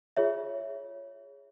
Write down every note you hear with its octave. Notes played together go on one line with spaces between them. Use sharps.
F4 G#4 C#5 E5